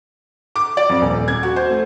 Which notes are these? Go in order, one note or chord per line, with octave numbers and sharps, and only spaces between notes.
D6
D5
F2
D#1
G#6
F#4
C5
A3